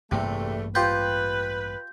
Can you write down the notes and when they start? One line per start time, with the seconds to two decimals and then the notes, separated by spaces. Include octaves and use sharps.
0.11 A1 E2 G2 C3 G3 A3 A#3
0.75 F4 G4 B4 C5 G6